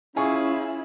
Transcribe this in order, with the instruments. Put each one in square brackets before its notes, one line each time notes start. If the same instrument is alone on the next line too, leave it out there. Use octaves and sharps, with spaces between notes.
[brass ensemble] C#4 [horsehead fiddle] E4 [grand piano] F4 G#4 C#6